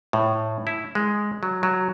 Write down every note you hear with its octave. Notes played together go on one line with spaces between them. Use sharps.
A2
E4
G#3
F#3
F#3